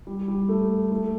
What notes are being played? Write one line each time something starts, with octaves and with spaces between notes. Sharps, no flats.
G3
G3
A3
A3